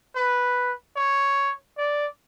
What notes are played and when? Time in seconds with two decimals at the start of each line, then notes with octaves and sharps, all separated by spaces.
0.16 B4
0.96 C#5
1.78 D5